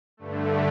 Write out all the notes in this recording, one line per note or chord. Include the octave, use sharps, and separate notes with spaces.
G2 D3 A3